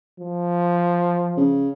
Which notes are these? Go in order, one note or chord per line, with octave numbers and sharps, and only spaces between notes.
F3
C#3